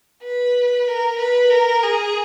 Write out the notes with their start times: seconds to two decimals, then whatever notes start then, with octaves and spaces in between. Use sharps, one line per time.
0.23 B4
0.87 A#4
1.19 B4
1.50 A#4
1.83 G#4